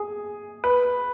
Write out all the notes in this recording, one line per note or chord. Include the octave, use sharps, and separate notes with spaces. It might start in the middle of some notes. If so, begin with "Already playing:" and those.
Already playing: G#4
B4